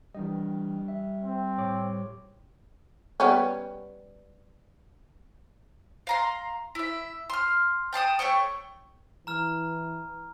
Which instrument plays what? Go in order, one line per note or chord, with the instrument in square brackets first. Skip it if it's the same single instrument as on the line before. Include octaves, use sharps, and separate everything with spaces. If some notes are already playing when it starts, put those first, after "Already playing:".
[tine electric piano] E3 D4 D#5 [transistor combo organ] G3
[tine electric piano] E5
[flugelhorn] C4
[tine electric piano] A2 C#5 D6
[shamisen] G3 B3 C#4
[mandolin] F5 A#5 C6
E4 E5
C6 F6
G5 A5 C6 D#6
A3 C#5 G5 C#6
[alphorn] E3 [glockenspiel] A#5 F6